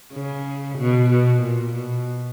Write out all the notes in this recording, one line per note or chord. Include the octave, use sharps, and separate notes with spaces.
C#3
B2
B2
A#2
B2